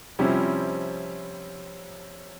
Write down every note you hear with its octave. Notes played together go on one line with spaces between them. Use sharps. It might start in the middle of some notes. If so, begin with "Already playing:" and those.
C3 F3 G3 C4 C#4 E4